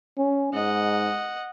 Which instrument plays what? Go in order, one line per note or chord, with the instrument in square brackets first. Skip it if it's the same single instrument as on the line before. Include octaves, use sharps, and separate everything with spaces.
[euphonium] C#4
[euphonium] G#2 [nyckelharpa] D#5 F#5